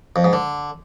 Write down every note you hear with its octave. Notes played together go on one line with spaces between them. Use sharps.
F2
G#2
D3